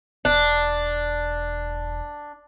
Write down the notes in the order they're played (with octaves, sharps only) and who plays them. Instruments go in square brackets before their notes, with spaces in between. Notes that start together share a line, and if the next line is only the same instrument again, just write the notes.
[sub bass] E1 [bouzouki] D4